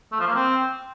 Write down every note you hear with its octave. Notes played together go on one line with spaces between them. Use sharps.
A3
F3
A#3
C4